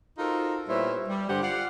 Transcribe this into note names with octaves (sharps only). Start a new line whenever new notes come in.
D#4 F4 F#4 A4 A#4 C5
A#2 G3 B3 E4 C5 C#5
G3
G2 D3 D4 G4 C5 F#5
F4 D5 F5 F#5